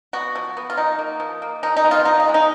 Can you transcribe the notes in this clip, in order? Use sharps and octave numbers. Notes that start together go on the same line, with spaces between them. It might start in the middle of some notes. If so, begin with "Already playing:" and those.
B3 F#4
F3
B3
F4
F3 D#4
A#3
F3
A#3
F3 D#4
D#4
G#3 B3
F4
F3 D#4
D#4
G#3 B3
D#4